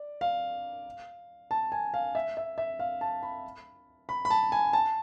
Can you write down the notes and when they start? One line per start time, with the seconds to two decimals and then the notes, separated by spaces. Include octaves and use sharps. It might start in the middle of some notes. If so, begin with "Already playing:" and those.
Already playing: D5
0.21 F5
1.51 A5
1.72 G#5
1.94 F5
2.15 E5
2.37 E5
2.58 E5
2.79 F5
3.01 A5
3.23 B5
4.09 B5
4.25 B5
4.30 A5
4.52 G#5
4.73 A5